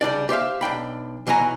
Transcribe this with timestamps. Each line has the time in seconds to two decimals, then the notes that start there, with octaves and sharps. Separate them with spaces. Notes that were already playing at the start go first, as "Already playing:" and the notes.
0.01 C#3 G3 D4 D5
0.29 G4 C5 E5 F5
0.61 B1 D4 G5 B5
1.27 B1 E3 F#3 G#5 A#5